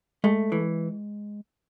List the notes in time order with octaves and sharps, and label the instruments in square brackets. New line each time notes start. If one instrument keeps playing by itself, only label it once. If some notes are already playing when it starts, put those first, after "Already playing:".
[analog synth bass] G#3 [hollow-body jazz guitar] A3
[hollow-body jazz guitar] E3